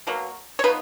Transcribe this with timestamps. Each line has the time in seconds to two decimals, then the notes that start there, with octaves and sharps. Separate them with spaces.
0.07 B2 F#3 A#3
0.59 C#5
0.64 F3 B3 D#4 B4